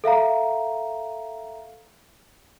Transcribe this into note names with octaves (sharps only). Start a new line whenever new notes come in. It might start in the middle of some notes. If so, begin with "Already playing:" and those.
A4 E5 F5 A#5